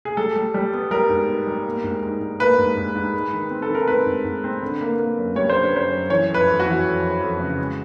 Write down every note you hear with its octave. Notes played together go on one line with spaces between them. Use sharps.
G#4
G3 A4
G3
G3
B3
G3 A#4
G#2
B3
G3
A#3
G#2
G#2
G#2
A#3 B4
G#2
G#2
G#2
G#3
D#3
C4
A4
D#3 A#4
C4 B4
G#2
G#2
C4
D3
A#3
A#3
F#2
G3 C#5
D3 C5
B4
F#2 C5
F#2
E3 C#5
F2
B4
F2
F#4
E3
F2
F2
F2
C#3
G#3